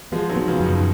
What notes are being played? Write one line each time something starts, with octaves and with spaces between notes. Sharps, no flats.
F3 G#3 B3
D#3 F#3
B3
C#3 F3
F#2
B2 D#3